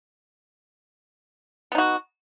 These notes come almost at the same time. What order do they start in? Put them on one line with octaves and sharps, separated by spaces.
B3 D#4 F#4